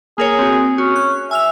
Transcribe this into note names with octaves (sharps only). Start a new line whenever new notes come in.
A#3 G#4 A#4 C#5
C4 F#4
C#4 F#4
F#6
E5 G#5 F6 F7